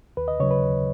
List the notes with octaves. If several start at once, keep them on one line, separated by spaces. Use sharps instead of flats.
D#2 B4
D#5
C#3 F#3 C#5
B4
D#2